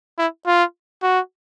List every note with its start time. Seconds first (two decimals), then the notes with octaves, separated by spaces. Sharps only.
0.18 E4
0.47 F4
1.03 F#4